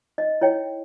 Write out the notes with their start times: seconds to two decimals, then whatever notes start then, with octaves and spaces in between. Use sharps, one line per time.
0.18 D#4 D#5
0.41 E4 C#5 G5